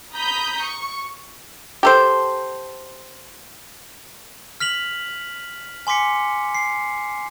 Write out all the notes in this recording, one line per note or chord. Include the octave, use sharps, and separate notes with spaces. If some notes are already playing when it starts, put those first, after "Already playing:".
A#5 B5 D#6 G6 B6
C#6
G4 A4 C5
F6 B6 F7 F#7
G#5 C6 D6 B6 C#7
C7